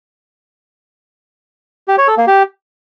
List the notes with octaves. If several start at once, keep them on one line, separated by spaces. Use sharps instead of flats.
G4
C#5
A4
A#3
G4